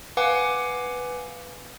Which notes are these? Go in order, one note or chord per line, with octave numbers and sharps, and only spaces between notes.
B4 F5 F#5 G#5 D6